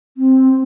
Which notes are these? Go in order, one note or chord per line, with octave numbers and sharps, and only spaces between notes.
C4